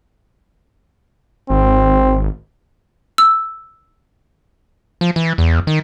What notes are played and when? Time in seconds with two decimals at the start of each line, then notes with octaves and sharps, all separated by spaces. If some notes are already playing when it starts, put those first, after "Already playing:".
1.50 G#1 C4
3.18 E6
5.01 F3
5.16 E3
5.38 E2
5.67 D#3